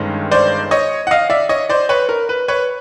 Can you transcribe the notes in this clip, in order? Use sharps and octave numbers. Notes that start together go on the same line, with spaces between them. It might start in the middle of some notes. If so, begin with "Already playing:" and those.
Already playing: G1 G2 D#3 G#3 C#4
C5 D5
C#5 D#5
F#5
D#5 F5
D5 E5
C#5 D#5
C5 D5
B4 C#5
A#4
B4
B4 C#5